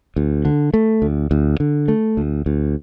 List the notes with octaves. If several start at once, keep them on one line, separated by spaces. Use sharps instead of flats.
D2
D3
A3
D2
D2
D3
A3
D2
D2